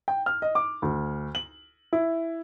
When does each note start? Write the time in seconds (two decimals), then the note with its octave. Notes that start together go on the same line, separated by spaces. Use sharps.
0.08 G5
0.26 F6
0.42 D#5
0.55 D6
0.82 D2
1.35 F#7
1.93 E4